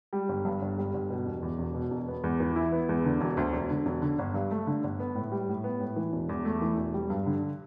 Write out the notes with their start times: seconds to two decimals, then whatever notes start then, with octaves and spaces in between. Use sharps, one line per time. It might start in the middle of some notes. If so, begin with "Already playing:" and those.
0.13 G3
0.29 G1
0.45 G2
0.62 G1
0.78 G3
0.94 G1
1.10 B2
1.26 E1
1.42 E2
1.59 E1
1.75 B2
1.91 E1
2.08 B3
2.24 E2
2.40 E3
2.56 E4
2.72 B3
2.89 E2
3.05 D3
3.21 E1
3.37 D2
3.53 E1
3.70 D3
3.86 E1
4.02 D3
4.19 G1
4.34 G2
4.51 A3
4.67 D3
4.84 G1
5.00 B3
5.15 A2
5.32 G3
5.48 A2
5.64 B3
5.80 A2
5.96 E3
6.13 E1
6.29 E2
6.45 A3
6.62 E3
6.77 E1
6.94 G3
7.10 G2
7.26 D3